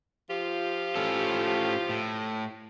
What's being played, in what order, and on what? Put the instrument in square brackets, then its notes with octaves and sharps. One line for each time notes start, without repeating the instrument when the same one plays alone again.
[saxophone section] F3 F4 G4
[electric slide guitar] A2 C#4 A4
A2